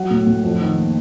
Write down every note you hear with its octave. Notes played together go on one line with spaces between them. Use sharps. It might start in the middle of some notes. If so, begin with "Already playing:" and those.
Already playing: F#3 F#5
A2
A2
F2
D#3
A#3